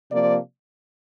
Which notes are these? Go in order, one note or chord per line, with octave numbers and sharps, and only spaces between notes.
C3 F3 A#3 D5